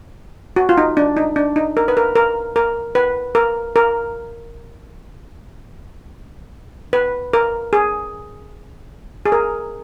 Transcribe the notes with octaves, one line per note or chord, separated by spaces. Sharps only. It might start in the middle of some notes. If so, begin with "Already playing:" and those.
F#4
F4
D#4
D4
D#4
D4
D#4
A#4
B4
A#4
A#4
A#4
B4
A#4
A#4
B4
A#4
G#4
G#4
A#4